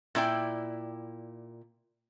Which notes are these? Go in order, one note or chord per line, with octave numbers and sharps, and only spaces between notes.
A#2 E4 D5 G5